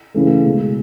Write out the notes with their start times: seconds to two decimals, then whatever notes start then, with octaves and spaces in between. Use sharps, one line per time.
0.14 C#3 E3 A3
0.44 B2 G#3